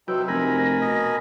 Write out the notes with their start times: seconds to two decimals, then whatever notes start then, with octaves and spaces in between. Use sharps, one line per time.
0.08 C3 F#3 C4 D#4 B4 G5 E6
0.28 F1 A#4 G#5 B5 A#6
0.81 B2 D#5